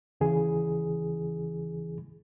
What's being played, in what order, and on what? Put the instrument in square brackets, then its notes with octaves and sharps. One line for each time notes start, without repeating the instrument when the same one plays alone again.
[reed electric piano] D#2 C#3 E3 G#4